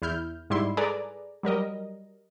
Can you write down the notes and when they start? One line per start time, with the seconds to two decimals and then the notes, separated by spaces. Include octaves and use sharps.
0.02 E2 E4 F6 G6
0.50 G#2 G3 E4 C6
0.77 G#4 A4 B4 D5 G#5 A#5
1.43 F#3 G3 A#4 D#5